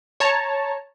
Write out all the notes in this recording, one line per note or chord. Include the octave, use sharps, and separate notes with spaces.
C#5 A5 A#5